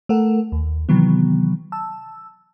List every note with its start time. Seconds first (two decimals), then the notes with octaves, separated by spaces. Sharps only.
0.09 A3 A4 A#4 F#5
0.52 D#2
0.89 C3 D#3 E3 F#3 B3
1.72 A5 E6